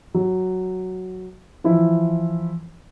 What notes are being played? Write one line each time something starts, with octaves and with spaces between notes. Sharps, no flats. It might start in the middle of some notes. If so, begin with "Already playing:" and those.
F#3
E3 F3 E4